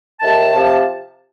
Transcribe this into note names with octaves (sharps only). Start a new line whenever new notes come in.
D#2 D#3 A3 A5
C3 F3